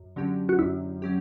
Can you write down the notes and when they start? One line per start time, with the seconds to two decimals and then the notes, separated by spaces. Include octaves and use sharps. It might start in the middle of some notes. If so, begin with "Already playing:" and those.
Already playing: F#2
0.16 D3 F#3 C#4 G4
0.49 F#4
0.59 F#2 E4
1.02 F#3 C#4 G4